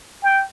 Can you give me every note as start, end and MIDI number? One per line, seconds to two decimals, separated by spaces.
0.24 0.45 79